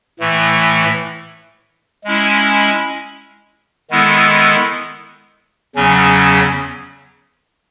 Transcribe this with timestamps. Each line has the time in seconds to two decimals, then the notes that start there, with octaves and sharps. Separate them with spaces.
0.20 A2 E3 A3
2.04 G#3 C#4 E4
3.90 D#3 G#3 B3 E4 A4
5.75 E2 C#3 F#3 C#4